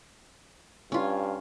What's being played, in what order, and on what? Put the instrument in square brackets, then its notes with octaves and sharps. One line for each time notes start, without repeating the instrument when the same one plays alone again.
[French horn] G2 [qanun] C#4 F4